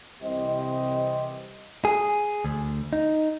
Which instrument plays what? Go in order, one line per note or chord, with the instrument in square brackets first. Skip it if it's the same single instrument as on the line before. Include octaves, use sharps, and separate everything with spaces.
[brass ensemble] C2 C3 E3 G4 C5 D#5
[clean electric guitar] G#4
D2
D#4